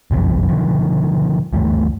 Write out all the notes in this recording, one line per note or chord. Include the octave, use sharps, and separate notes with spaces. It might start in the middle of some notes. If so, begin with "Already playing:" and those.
F#1 B1 F2 E3
B2 D3 D#3 F3
D2 G2 E3 A3